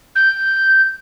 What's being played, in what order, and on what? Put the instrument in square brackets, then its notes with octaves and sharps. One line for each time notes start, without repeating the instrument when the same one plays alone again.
[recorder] G6